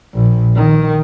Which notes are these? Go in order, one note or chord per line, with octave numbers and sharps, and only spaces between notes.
A#1
D#3